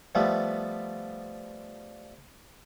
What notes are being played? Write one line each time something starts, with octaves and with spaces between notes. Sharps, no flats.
F3 G3 A3 B3